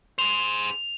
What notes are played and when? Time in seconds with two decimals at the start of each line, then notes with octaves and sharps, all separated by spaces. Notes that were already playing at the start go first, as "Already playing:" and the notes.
0.19 G#4 C5 F7